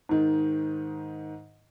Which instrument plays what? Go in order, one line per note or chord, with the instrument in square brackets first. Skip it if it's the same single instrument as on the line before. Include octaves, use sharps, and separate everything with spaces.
[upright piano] G#2 D#3